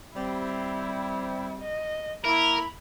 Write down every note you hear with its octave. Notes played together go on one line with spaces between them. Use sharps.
G3 C4 E4
D#5
A#3 E4 A#4 B5